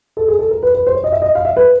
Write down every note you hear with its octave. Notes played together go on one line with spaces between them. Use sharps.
A4
G#4
A4
A#4
B4
B4
C5
C#5
D#5
E5
D#5
F5
E5
B4